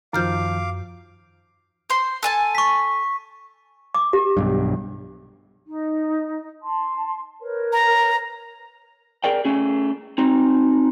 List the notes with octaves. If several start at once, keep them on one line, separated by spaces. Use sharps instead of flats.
F#2 D#3 F3 F5 D6 F6 G6
C5 C6
A4 G#5 A5
C#6 B6
D6
G4
B1 G2
D#4
A5 C6
A#4 B4 C#5
A#5
G#4 A#4 D5 G5
A3 C#4 G#4
C4 D#4 F#4